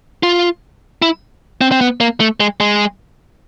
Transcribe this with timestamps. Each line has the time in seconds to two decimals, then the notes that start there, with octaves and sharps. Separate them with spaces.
0.23 F4
1.02 E4
1.61 C4
1.72 C4
1.81 B3
2.00 A#3
2.20 A3
2.40 G#3
2.60 G#3